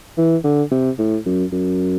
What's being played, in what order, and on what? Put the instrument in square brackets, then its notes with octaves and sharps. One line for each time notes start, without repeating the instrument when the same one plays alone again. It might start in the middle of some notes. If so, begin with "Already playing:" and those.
[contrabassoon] E3
D3
C3
A2
F#2
F#2